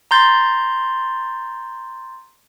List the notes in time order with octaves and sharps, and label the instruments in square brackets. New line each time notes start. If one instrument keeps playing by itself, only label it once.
[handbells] A#5 C6 G6 A6